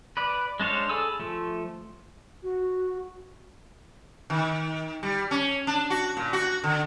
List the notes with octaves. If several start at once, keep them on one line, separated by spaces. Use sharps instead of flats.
B4 D5
G#3 D4 C5 C#5 F5
G#4 A4 G#5 B5 E6
F3 A3
F#4
D#3
G3
C#4
D4
F#4
A#2
F#4
D3